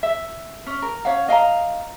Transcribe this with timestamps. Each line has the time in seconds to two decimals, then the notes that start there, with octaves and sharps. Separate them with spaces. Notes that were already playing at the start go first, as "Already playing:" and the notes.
0.03 E5
0.67 C#4
0.82 A#4
1.05 C#4 C#5 F5 F#5
1.29 D#5 F5 G5 A#5